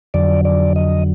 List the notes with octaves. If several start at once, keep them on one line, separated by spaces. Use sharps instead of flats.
F2 D3 F#3 D5
D5
D#5